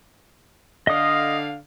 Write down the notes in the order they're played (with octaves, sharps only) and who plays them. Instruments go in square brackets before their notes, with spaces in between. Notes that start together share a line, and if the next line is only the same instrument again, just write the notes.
[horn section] D3 F5 [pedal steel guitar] D#5 D#6